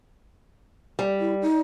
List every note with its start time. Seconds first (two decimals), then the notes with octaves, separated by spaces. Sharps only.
0.99 G3
1.20 E4
1.42 D#4